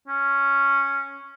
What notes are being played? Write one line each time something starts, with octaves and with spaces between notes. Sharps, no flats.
C#4